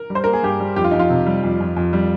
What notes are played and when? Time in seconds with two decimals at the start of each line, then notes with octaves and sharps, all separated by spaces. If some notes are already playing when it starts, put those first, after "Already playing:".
Already playing: A#4
0.10 G3
0.15 C5
0.24 A#3 A#4
0.33 G#4
0.43 G2 G4
0.60 G3
0.76 F2 G4
0.84 F4
0.91 F2 D#4
0.99 F4
1.10 C3
1.26 G3
1.43 F2
1.60 F2
1.76 F2
1.93 G3